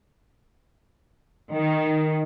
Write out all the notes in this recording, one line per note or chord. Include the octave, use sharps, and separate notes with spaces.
D#3